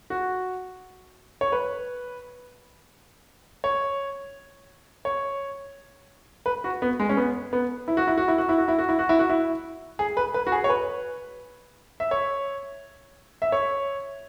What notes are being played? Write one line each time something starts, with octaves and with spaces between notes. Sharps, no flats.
F#4
C#5
B4
C#5
C#5
B4
F#4
B3
G#3
C#4
B3
B3
E4
F#4
E4
F#4
E4
F#4
E4
F#4
E4
F#4
E4
F#4
E4
F#4
E4
G#4
B4
B4
F#4
G#4
C#5
B4
E5
C#5
E5
C#5